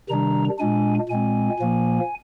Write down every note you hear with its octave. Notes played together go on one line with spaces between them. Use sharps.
C3 D#3 G3 D4 A#5
A#2 G#3 D4 G#5
A#2 G#3 C4 G#5
A#2 F3 A#3